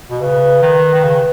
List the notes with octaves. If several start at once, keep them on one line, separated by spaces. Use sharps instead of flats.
B2
C#3 B4
D#3
D#3
C#3